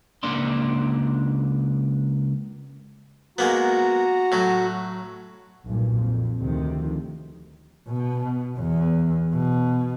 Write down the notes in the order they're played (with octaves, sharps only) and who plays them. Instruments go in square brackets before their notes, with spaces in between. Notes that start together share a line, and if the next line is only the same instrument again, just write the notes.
[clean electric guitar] C#2 A#3 D4 D5 C6
[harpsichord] G#3 A#3 B3 [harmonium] F#4 A#5
[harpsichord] A2 F#3
[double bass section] B1 G2 A#2
F2
D2 C3 D#3 F3
[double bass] B2
E2
B2